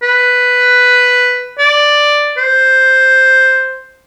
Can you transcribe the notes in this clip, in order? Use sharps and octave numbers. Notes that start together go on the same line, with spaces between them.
B4
D5
C5